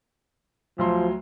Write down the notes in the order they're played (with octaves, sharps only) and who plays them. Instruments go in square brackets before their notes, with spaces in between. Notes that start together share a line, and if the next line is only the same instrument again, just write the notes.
[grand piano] D2 F#3 C6 [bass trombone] F3